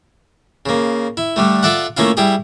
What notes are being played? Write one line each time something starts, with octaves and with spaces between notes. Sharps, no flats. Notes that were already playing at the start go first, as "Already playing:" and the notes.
C#3 A#3
E4
D3 G3 A3
F4 A4 D5 E5 F#5
A3 A#3 C#4 E4 F4
G3 E4 G4 G#4